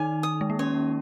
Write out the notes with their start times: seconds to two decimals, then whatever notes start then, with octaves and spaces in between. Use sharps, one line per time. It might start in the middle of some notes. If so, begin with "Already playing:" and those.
Already playing: D#3 D#4 G#5
0.23 D#6
0.41 G#3
0.50 A#3
0.59 C#4 C#5